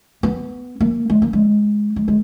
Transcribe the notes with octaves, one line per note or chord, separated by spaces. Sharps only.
B3
A#3
G#3
A#3
G#3
G#3
G#3